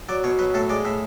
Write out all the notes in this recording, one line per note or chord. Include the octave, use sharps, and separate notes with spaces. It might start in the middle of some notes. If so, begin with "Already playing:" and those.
F#3 D5
B2 C#5
F#3 B4
A2 A4
G#3 D5
A2 E5